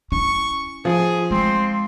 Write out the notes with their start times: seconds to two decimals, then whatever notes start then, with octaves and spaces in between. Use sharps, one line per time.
0.12 C#4 E4 C#6
0.85 F3 G#4
1.31 G#3 C4 C6